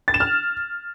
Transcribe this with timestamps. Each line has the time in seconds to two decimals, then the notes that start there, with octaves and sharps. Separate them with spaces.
0.08 A6
0.14 E7
0.20 F6